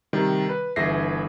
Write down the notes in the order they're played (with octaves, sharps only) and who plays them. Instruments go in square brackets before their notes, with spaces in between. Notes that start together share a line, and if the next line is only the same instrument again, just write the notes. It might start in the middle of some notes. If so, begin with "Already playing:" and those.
[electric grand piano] C3 D#3 G3
B4
G1 E3 G#4 E5 A#6 C7